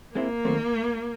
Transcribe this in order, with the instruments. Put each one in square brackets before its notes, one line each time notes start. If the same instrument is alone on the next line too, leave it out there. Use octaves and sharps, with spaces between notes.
[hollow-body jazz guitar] G#3 C4 E4 [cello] A#3
[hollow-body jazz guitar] D#3 F#3 A3 C4